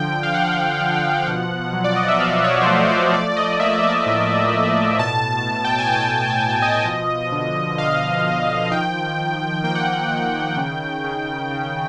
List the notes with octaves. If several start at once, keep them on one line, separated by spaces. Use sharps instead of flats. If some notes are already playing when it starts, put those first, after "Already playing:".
Already playing: D3 F3 G5
F5
D3 F#5
F3
B2
F#3
D5
D#5
E5
B2 F5
C#5
C5
A3 C#5
D5
F3 D5
D5
D#5
A#3 E5
D5
A2
A2
B2 A5
B2
G5
G#5
B2 A5
B2
D#5
F3
D3
D3 F5
F3
D#3 G5
D#3
A#3 G5
F#5
G5
D#3
C#3
C#3
C#3